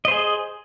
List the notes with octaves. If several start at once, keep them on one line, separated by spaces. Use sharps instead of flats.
G#4 C5 D#5